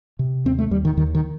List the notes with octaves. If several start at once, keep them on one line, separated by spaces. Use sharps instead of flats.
C3
D#2 C4
A3
D#2 G3
D#3
D#2 D#3
D#3